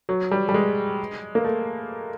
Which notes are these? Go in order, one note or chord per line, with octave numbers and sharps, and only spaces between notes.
F#3
G3
G3
G#3
A#3
A3